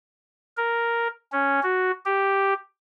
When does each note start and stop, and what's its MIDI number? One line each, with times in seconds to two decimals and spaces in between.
0.57 1.08 70
1.32 1.60 61
1.63 1.91 66
2.05 2.53 67